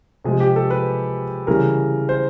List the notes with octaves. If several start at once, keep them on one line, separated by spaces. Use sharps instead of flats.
C3 F3 G#3 G#4
G4
A4
B4
C#3 E3 G3 A#4
C5